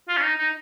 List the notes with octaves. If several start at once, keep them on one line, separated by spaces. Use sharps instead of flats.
F4
C#4
D#4
D#4